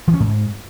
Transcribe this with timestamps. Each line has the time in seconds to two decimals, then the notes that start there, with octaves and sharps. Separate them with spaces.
0.08 E3
0.14 C#4
0.20 G#2